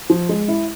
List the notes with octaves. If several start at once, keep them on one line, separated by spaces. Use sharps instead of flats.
F3
G#3
E4